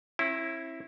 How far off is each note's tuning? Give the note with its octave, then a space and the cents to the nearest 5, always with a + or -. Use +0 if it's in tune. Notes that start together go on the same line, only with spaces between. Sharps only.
C#4 -45 E4 +0